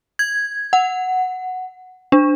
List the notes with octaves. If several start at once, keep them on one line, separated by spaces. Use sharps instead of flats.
G#6
F#5
D4